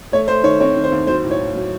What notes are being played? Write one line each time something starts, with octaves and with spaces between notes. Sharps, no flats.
A3 C#5
A3 C5
D#3 C#5
C4 C#5
D#3
C5
D#2
F#3 C5
A2
C#5
A2
F#3